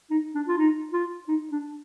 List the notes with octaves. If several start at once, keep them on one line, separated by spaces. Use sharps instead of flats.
D#4
D4
F4
D#4
F4
D#4
D4